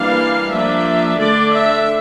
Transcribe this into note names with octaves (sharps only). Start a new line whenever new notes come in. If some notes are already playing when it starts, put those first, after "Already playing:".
Already playing: E3 G3 A#3 D4 F5
F3 A#3 D4 E5
D3 A3 D4 D5
E5